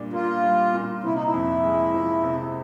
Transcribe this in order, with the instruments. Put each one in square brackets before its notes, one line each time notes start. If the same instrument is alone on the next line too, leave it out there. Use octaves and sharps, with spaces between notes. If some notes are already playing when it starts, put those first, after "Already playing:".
Already playing: [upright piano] A#2 G3 D4
[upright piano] A#3 [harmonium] F4
[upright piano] G3
A#2
[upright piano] C3 [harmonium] E4
[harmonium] D#4
E4
[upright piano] F2
G#3
F3
C3